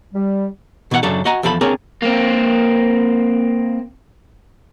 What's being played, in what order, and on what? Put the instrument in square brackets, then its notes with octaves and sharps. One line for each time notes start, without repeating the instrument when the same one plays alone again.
[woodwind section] G3
[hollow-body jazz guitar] B2 D#3 E3 C#5 F#5
F#2 C#3 F#3 D4 A4
F#4 D#5 F#5 G#5 A#5
E2 F3 A4 B4 B5
C4 D4 G#4 A#4 C#5 A#5
[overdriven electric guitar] A#3 C4